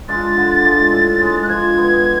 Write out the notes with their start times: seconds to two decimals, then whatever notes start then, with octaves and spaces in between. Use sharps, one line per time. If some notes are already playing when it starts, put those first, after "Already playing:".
0.08 G#3 D4 F4 A6
0.37 D3
0.65 G#3 D4 F4
0.92 A2
1.21 G#3 D4
1.43 F#6
1.49 F3 G#6
1.78 G#3 B3